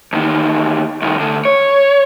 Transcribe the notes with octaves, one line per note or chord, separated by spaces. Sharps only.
E2 D#3
C2 D#3
D2 D3
C#5